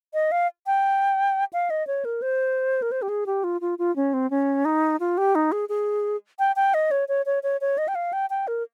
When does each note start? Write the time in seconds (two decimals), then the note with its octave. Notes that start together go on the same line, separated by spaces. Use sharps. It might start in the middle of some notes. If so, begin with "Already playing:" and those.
0.14 D#5
0.32 F5
0.66 G5
1.53 F5
1.70 D#5
1.87 C#5
2.05 A#4
2.22 C5
2.82 A#4
2.92 C5
3.02 G4
3.09 G#4
3.26 G4
3.44 F4
3.61 F4
3.79 F4
3.96 C#4
4.14 C4
4.31 C#4
4.65 D#4
5.00 F4
5.18 G4
5.35 D#4
5.52 G#4
5.69 G#4
6.39 G5
6.56 G5
6.74 D#5
6.91 C#5
7.09 C#5
7.26 C#5
7.43 C#5
7.61 C#5
7.78 D#5
7.88 G5
7.95 F5
8.13 G5
8.30 G5
8.48 A#4